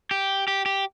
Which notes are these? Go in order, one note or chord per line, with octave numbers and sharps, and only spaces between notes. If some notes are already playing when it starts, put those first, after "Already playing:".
G4
G4
G4